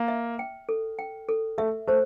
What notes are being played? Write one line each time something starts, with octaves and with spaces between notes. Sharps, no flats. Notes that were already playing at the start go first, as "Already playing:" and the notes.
Already playing: A#3
E5
G5
A4
G5
A4
A3 E5
A3 C5